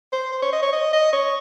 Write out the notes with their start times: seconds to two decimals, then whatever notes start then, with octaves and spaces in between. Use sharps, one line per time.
0.12 C5
0.32 C5
0.42 C#5
0.53 D#5
0.62 C#5
0.73 D#5
0.93 D#5
1.13 C#5